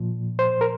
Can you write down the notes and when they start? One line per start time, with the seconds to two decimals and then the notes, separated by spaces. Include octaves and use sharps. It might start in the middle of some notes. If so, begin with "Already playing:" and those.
Already playing: A#2 F3
0.39 C5
0.61 A#4